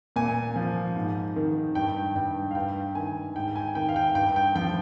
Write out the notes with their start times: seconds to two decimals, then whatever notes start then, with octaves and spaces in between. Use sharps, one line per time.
0.16 A#2 G#5
0.56 F3
0.96 G#2
1.36 D#3
1.75 G2 G5
2.15 G2 G5
2.51 F5
2.55 G2 G5
2.95 D#3 G#5
3.36 G#2 G5
3.56 G#5
3.75 D#3 G5
3.89 F5
3.96 G5
4.15 G2 G5
4.36 G5
4.55 F3 G5